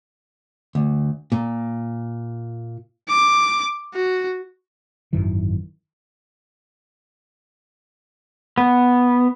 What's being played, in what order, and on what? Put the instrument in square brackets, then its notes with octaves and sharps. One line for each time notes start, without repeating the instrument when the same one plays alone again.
[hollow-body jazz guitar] D2
A#2
[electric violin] D6
F#4
[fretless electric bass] G#1 F#2 D#3 E3
[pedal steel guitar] B3